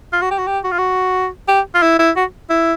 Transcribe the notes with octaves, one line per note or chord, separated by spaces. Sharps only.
F4
F#4
G4
F#4
G4
F#4
F4
F#4
G4
F4
E4
E4
F#4
E4